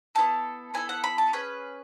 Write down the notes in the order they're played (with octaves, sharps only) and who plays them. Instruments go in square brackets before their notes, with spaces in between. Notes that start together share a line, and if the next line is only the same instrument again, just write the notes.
[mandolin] B3 E4 A4 A5
B3 E4 A4 G#5
F#5
B5
A5
C#4 G#4 B4